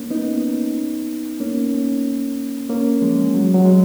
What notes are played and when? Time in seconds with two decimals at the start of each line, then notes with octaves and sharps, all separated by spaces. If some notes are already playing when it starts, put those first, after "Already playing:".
Already playing: A#3 C#4
0.10 B3 D#4
1.40 A#3 C#4
2.69 A#3 C#4
3.02 F3 G#3
3.34 F#3
3.44 G#3
3.54 F#3
3.65 G#3